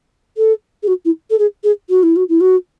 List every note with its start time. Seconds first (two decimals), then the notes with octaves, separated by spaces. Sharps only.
0.37 A4
0.83 G#4
0.87 F#4
1.05 E4
1.30 A4
1.39 G#4
1.64 G#4
1.89 F#4
2.03 E4
2.16 F#4
2.29 E4
2.40 F#4